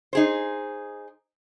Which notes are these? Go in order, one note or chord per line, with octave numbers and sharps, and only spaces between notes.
D#4 G#4 C5